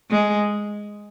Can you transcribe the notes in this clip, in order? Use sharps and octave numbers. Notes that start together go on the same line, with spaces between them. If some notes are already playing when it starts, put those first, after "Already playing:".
G#3